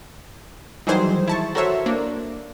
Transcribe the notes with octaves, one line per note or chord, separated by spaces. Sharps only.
D#3 E3 F#3 G3 G#4 C5
E4 A5 C#6
F#4 A4 A#4 C5 C#5 E5
A#3 D4